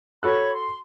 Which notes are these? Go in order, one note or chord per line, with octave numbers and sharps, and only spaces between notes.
F#4 A4 C#5 B5 C#6 F#6
C6